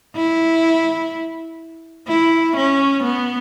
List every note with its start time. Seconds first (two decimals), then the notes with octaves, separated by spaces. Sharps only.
0.15 E4
2.08 E4
2.56 C#4
3.03 B3